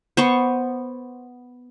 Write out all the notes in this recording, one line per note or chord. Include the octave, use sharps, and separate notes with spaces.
B3 C5 C#6